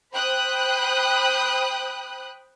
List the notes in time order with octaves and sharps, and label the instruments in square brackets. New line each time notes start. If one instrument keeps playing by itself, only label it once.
[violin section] C5 G5 B5 D#6 F#6